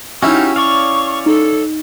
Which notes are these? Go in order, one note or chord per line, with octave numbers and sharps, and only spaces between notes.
C#4 D#4 E4 F#4 G4 F5
C#5 D5 F5 C#6
D#4 A4